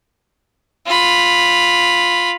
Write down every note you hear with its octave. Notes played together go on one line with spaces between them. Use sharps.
F4 B5